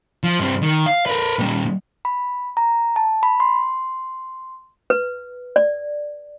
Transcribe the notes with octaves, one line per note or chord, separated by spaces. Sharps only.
F3
G2 C4
D#3
F5
A#4 B4
A#2 G3
B5
A#5
A5
B5
C6
B4
D5